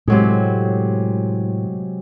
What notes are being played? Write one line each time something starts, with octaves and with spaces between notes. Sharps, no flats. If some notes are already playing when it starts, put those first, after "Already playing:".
A2 C3 F#3 G#3